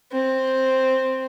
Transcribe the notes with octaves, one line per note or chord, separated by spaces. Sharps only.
C4